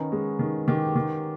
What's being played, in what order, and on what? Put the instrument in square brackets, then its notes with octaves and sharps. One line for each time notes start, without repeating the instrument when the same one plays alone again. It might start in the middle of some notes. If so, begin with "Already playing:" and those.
Already playing: [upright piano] D#3 [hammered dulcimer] B3 C#4 D#4
[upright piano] G#3
D#3
[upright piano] D#3 [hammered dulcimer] G4
[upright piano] D#3